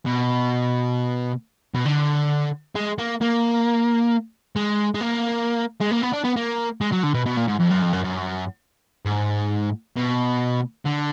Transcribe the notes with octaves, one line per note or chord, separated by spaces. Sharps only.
B2
B2
D3
G#3
A#3
A#3
G#3
G#3
A#3
G#3
A#3
B3
D4
B3
A#3
G#3
F#3
D3
B2
B2
A#2
G#2
F2
F#2
F2
F#2
F#2
G#2
B2
D3